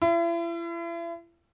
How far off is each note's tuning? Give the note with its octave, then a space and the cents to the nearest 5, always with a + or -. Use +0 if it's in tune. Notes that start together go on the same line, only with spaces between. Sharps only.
E4 +40